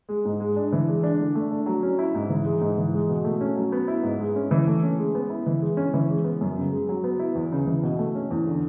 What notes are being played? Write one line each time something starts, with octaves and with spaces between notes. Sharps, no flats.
G#3
G#2
G#3
D4
E3
G#3
D4
D3
A3
D4
F#3
C#4
E4
G#2
E3
G#3
G#2
E3
G#3
B2
A3
C#4
F#3
B3
E4
G#2
G#3
C#4
E3
A3
C#4
G#3
B3
E4
E3
G#3
C#4
E3
G#3
B3
F#2
C#3
G#3
F#3
B3
E4
E2
C#3
E3
B2
A3
C#4
E2
D3